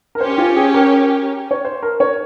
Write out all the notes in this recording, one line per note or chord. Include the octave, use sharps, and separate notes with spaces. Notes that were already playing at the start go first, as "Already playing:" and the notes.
A#4
C#4 G4 C5 C#5
F4
G#4
A#4
C#5
C5
A#4
C#5